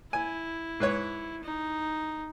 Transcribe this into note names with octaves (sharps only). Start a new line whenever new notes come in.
E4 G#5
G#2 B4 C#5
D#4